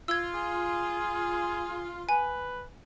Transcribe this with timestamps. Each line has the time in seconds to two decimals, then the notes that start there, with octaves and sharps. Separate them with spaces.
0.08 F4 E6 G#6
0.34 G#4
2.09 B4 G#5